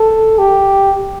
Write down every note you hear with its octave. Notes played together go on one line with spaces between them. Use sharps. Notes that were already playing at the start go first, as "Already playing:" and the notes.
Already playing: A4
G4